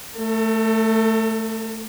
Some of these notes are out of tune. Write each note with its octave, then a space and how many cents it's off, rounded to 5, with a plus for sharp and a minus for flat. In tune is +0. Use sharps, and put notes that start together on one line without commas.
A3 +0 A4 +45